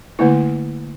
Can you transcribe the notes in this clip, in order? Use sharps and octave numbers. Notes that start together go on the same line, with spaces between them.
D3 A3 A#3 E4